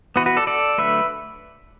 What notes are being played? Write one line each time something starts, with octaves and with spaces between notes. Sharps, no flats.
E3 B3 F#4 B4
F#4 B4
A4 D5
A4 D5
D3 F#3 A3 B4 E5